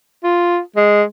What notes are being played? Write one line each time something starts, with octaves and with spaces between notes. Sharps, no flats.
F4
G#3